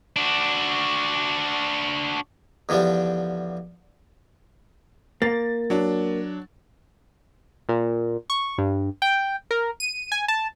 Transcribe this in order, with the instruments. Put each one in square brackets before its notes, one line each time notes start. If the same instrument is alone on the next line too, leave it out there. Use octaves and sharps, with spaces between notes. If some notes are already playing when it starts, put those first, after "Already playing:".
[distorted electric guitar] D4 F#4
[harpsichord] E2 D3 F3 G3 D4
[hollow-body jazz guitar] A#3 [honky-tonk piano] A6
[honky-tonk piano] F#3 D4
[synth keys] A#2
C#6
G2
G5
A#4
D#7
G#5
A5